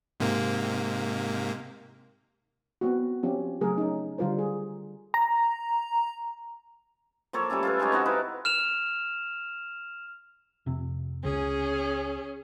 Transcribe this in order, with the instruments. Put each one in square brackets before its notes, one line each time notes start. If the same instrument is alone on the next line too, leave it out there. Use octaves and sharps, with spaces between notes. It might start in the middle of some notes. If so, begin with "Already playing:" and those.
[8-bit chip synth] G#2 C3 A#3
[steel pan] B3 C4 F#4
F3 C4 C#4 F4 G4
C#3 F#3 A3 G#4 A#4
C#4 D#4
D3 G3 F4 A#4 C5
G#4
[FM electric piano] A#5
[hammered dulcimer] F3 A#3 A4 C#5
G3 A3 C#4 A4
F4 A4 B4
G#3 D#4 G4 C#5
C4 D#4 F#4 A4
E4 F4 B4
[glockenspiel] F6 E7 F7
[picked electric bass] F1 C3
[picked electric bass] C#2 [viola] C#4 G#4